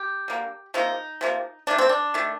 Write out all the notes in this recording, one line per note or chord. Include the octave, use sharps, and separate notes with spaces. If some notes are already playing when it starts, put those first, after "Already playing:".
Already playing: G4
D3 G3 A#3
C3 F3 A#3 D#4
C3 F3 A#3
D#3 A3 D4
C4
D4
D#3 A3